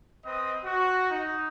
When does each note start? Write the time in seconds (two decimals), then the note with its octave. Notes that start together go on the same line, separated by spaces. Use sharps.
0.24 C4 B4 C5 D#5 D#6
0.65 F#4
1.11 D#4